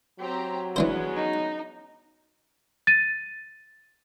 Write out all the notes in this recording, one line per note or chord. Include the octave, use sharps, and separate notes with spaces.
F#3 C4 G4 A#5
E3 G#3 B3 C#4 D4 C5
D#4
A6 D#7